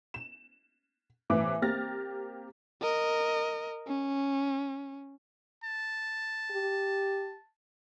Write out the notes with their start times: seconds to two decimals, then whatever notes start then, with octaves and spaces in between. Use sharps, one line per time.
0.14 E7
1.30 A2 C3 E3 B4 E5 D6
1.62 A#3 C4 G4 F6 A6 A#6
2.82 A#4 D#5
3.87 C#4
5.64 A5
6.51 G4